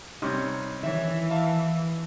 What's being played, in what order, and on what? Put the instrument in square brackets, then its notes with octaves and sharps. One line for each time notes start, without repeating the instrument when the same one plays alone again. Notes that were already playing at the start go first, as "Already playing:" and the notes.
[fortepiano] C3 G3 C#4 [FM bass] D#4
[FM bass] D#3 [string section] E3 [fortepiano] C#5 E5
[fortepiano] E5 F5 A5